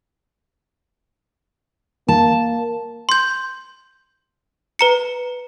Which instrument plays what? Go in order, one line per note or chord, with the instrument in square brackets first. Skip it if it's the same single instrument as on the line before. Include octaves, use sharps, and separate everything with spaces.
[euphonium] A#3 [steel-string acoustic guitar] A5
[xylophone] C6 G6
B4 A#5 C#7